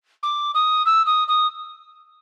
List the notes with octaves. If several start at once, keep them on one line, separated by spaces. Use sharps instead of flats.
D6
D#6
E6
D#6
D#6